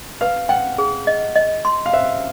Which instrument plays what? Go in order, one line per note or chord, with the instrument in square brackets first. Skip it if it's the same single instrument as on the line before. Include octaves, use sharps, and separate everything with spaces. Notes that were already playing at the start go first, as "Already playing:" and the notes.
[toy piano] B4 [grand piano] F5
[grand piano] F#5 [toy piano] G5
[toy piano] G#4
D#5
D#5
C6
[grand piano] F5
[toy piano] C5 [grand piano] E5